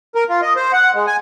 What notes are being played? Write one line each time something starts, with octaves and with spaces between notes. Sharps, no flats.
A#4
F4
D#5
C5
F#5
G#3
G#5